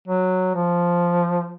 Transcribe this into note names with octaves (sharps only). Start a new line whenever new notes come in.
F#3
F3